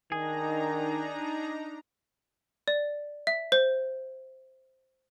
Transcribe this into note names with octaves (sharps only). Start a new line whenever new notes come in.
D#3 D4 D#4 G#4 A#5
D5
E5
C5